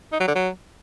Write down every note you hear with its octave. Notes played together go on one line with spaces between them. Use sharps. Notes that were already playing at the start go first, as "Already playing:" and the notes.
D#4
F#3
D3
F#3